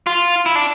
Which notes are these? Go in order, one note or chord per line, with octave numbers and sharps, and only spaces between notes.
F4
E4
D4